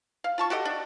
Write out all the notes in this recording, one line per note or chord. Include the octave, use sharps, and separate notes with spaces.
F5
F4 A5 C#6
F#4 G4 A4 D#5
D4